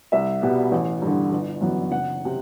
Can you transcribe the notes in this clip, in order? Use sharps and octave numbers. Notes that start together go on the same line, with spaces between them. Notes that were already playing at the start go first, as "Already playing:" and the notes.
C2 E5
B2 G3 B3
A1
G2 D3
G1
F#2 E3 B3
F#1 F#5
C3